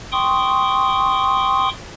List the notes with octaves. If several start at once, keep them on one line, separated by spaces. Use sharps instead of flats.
G5 C6 C#6 D#6